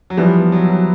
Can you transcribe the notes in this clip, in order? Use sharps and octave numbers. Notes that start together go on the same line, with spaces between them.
F#3
E3 F3 G3 B3
F#3
F#3